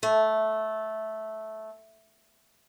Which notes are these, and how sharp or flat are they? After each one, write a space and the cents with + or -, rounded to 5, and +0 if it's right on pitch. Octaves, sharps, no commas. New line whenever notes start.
A3 -10